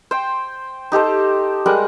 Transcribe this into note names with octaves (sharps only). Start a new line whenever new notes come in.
C5 G5
D#4 G4 A4 C5
G3 G#3 A#4 F#5